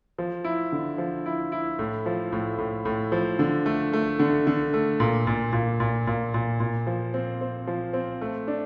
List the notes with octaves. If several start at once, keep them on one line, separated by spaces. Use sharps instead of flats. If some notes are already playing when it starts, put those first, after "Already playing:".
F3
E4
D3
F3
E4
E4
A2
F3
A2
A2
A2
F3
D3
A3
A3
D3
D3
A3
A#2
A#2
A#2
A#2
A#2
A#2
A#2
F3
C4
C4
F3
C4
A3
D4